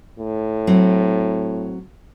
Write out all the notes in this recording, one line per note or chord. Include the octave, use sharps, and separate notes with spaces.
A2
F#3 C4